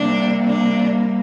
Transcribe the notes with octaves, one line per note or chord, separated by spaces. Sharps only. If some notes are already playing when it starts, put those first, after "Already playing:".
Already playing: C3 G3 A#3 D4
D4